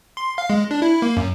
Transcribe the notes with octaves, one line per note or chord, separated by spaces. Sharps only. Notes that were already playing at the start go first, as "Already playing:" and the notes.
C6
F5
G#3
D4
E4
A#3
F#2